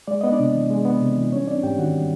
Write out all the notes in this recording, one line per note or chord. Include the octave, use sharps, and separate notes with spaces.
G#3 D5
B3 D#5
D4 D5
C3
E3
G#3
B3
C3
E3
G3 C#4 C#5
C4 D4 D5
G#2 G4 G5
D#3 F#4 F#5
G3